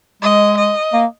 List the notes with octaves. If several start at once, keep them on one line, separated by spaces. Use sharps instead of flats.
G#3 D#5
D#5
A#3